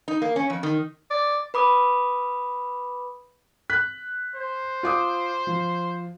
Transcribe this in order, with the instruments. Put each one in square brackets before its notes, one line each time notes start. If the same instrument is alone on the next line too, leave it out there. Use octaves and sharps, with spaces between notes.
[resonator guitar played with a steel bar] D#4
A#3
C#4
F2
D#3
[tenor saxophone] D5
[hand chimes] B4 B5 D6 D#6
[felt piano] F#6 B6
[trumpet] C5
[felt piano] F4 D6 D#6
F3